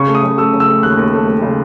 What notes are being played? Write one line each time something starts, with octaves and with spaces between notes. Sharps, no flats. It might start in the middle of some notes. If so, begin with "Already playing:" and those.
Already playing: C#3 C#6
A3
D#6
C#3
A3 E6
C#3
E6
A3
D#2 F#6
D#2
A3
A3
C#3